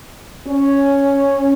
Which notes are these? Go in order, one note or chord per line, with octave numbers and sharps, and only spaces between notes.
C#4